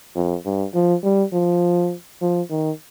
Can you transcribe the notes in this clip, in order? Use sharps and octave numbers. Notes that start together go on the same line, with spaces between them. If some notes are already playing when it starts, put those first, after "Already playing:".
F2
G2
F3
G3
F3
F3
D#3